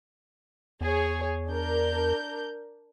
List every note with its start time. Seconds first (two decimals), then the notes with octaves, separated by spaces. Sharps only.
0.81 E2 G#4 C#5
1.48 D4 A#4 G6